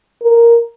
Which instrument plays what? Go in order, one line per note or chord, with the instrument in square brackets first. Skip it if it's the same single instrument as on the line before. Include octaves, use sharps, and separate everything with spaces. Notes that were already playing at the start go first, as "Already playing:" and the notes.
[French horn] A#4